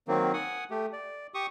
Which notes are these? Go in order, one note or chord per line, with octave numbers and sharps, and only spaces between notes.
D#3 F#3 A#3 C4
F#5 G#5 D#6
A3 G4
D5
G4 C#6 D#6